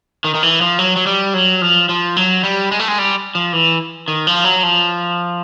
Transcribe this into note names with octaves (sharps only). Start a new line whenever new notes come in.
D#3
D#3
E3
F3
F#3
F#3
G3
F#3
F3
F3
F#3
G3
G#3
A3
G#3
G3
F3
E3
D#3
F3
F#3
F3